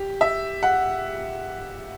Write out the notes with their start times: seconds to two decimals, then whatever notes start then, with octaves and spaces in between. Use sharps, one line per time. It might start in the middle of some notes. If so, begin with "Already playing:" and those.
Already playing: G4
0.21 E5
0.63 F#5